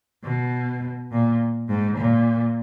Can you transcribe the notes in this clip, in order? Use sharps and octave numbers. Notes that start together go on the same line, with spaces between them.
B2
A#2
G#2
A#2